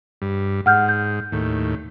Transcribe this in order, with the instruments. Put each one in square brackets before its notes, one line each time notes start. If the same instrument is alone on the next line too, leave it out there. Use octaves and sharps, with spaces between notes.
[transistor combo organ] G2
[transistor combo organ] G#2 [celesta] F#5 F6 G6
[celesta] G6
[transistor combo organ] D#2 A2